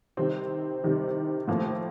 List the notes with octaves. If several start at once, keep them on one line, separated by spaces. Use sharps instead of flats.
C3 D#3 G3 C4
C3 D#3 G3
A2 F3 A#3